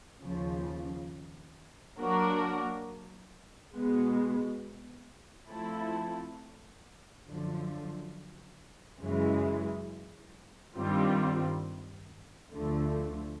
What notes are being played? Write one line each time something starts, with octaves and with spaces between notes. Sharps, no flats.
D#2 C#3 F3
F#3 A#3 D4 F#4 A#4
B2 G#3 B3
F3 A3 C4 E4 A4
F#2 D3 F3
F#2 C#3 E3 G#3
G2 D#3 G3 C4 F4
D2 D3 F3 A3